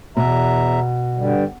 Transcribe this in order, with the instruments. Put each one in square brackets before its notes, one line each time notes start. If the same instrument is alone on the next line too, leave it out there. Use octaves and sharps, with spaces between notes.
[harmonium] E2 E5 A#5 [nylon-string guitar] B2
[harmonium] G2 D3 G3